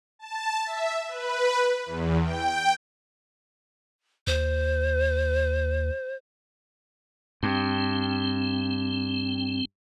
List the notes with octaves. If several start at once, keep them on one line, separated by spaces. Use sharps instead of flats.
A5
E5
B4
E2
G5
D#2 C5
G2 C4